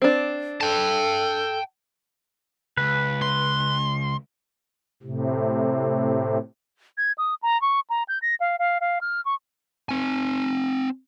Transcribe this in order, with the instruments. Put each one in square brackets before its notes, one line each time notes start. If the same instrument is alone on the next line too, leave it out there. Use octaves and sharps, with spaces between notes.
[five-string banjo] C4 D4
[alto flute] A4 [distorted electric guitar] G5 A5
[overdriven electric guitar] C#2 [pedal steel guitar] B4
[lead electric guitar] C6
[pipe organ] A2 C3
[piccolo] G#6
D#6
A#5
C#6
A#5
G6
A#6
F5
F5
F5
F6
C#6
[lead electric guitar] C4 G#5